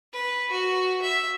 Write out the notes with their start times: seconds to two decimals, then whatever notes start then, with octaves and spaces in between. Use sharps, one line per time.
0.13 B4
0.51 F#4
1.02 E5